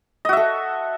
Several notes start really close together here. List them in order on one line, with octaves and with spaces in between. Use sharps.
D#5 F#4 E5 A4